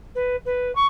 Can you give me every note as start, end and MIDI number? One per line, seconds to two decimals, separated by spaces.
0.15 0.36 71
0.45 0.74 71
0.75 0.87 85